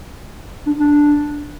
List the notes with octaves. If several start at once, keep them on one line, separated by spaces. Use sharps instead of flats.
D4
D4